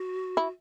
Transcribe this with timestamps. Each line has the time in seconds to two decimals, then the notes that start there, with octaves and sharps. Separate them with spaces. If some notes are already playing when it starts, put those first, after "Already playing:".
Already playing: F#4
0.37 E4